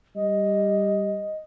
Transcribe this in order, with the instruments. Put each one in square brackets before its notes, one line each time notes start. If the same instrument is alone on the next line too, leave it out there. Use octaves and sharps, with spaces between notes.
[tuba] G3 [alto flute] D#5